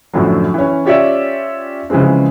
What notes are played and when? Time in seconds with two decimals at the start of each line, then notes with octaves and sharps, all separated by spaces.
0.13 F#2 A2 D3 F3 F#3
0.54 E3 C#4
0.85 C#4 F4 G4 C#5 D5 E5
1.90 C#3 E3 F3 G#3 C4